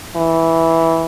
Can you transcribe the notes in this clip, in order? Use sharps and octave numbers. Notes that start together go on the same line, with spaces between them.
E3